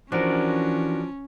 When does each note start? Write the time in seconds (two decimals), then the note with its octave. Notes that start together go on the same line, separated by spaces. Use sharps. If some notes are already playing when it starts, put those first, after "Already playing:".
0.12 E3 F3 C#4 D4 F#4 A#4